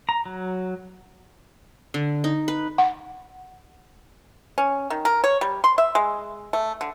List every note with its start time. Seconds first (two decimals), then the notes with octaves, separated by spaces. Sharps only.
0.09 A#5
0.26 F#3
1.94 D3
2.24 D#4
2.48 B4
2.78 F#5
4.58 C#4
4.90 D#3
5.05 A#4
5.24 C#5
5.41 G3
5.64 C6
5.78 E5
5.95 G#3
6.53 A3
6.81 D3